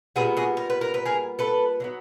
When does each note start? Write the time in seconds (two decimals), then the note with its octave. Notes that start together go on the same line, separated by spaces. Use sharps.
0.16 A#2 G3 B3 F#4 G#4
0.37 F#4 G#4
0.57 A#4
0.70 B4
0.81 A#4
0.94 B4
1.05 G#4 A#4
1.39 A4 B4
1.80 D3 F#3 B3